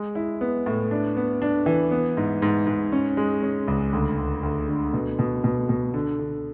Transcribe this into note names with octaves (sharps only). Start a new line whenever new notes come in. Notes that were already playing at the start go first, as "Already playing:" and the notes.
Already playing: G#3
E4
B3
A2
D4
B3
D4
E3
B3
G#2
G#2
G#2
C#4
G#3
C#4
C#2
D2
D2
D2
D3
B2
B2
B2
B2
D3
D3